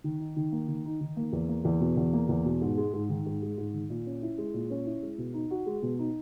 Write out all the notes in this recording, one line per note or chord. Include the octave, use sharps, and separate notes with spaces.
D#3
D#4
D#3
A#3
D#3
D#4
D#3
A#3
E2
A#3
E2
B2
E2
A#3
E2
B2
G#2
G#3
G#2
D#3
G#2
G#3
G#2
D#3
A#2
C#4
E4
G#3
A#2
C#4
E4
G#3
B2
D#4
F#4
G#3
B2
D#4